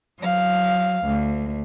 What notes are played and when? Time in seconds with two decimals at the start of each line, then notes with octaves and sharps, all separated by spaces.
0.19 F#3 F5
1.05 D2